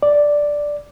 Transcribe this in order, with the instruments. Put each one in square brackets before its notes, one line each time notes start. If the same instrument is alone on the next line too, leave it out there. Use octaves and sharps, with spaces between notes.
[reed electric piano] D5